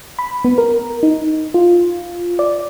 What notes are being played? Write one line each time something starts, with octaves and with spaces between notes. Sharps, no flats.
B5
B3
A#4
D#4
F4
D5